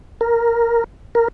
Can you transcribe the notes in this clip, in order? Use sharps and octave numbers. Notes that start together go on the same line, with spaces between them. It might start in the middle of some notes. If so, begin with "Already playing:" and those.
A#4
A#4